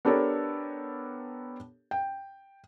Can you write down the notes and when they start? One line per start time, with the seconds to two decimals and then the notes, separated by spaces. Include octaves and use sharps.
0.05 B3 D4 G4 A4 A#4 C#5
1.91 G5